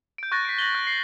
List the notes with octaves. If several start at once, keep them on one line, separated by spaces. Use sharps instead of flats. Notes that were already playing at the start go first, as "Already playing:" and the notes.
G6 D7
C#6 F#6 A6 A#6
B6 C7 D7
A#6 F#7 G7
F#6
C7